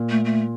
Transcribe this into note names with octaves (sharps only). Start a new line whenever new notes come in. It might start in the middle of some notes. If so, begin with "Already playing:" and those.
Already playing: A#2
A3
A3